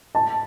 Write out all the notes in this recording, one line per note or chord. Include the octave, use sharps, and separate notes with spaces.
A5